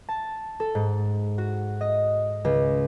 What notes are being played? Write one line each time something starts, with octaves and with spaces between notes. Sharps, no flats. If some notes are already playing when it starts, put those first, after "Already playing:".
A5
A4
G#2
F#4
D#5
C#2